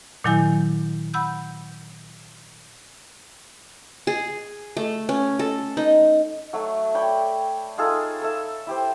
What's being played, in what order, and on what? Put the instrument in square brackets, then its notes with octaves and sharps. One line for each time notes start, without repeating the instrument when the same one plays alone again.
[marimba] A#2 D#3 F#3 E4 G#5 G6
F#5 B5 E6 G6
[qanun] G#4
A3
C#4
A4
D#4
[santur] F#3 A3 F#4
C#5 D5 G5 B5
D#4 F4 G#4 A4
A4 E5
E4 G4 C5